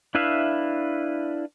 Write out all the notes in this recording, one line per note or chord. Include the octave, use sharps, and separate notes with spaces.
D4 E4 B4 E5 F5